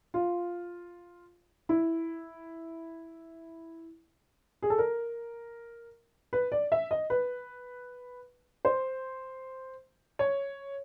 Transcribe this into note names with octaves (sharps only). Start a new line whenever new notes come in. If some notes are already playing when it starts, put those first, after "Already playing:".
F4
E4
G#4
A4
A#4
B4
D5
E5
D#5
B4
C5
C#5